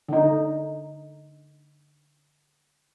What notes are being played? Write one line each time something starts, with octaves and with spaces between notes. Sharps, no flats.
D3 D#4